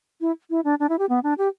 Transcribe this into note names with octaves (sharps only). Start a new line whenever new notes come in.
E4
E4
D4
D4
E4
G4
B3
D4
G4